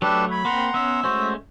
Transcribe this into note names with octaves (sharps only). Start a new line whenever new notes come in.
F#3 A3 D4 G4 A4 B4
C#5 B5
A#3 C4 F#5 A#5 C6
B3 C#4 E5
G#3 A3 C#4 F#4 C5